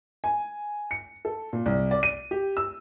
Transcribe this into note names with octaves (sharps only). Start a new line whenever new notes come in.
G#5
C#7
A4
A#2
C2
D5
D#7
G4
E6